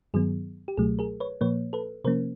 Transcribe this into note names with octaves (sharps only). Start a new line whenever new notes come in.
G2 D#3 F#3 B3 G#4
G4
C#2 B2 F#3 A3 G#4
G#4 A#4
B4 C#5
A#2 F3 A#3 B4 C#5
A4 B4
C3 F3 A#3 C#4 A#4 C5